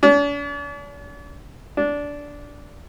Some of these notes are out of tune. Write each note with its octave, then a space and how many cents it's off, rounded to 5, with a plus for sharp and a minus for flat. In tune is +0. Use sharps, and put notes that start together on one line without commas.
D4 -45
D4 -15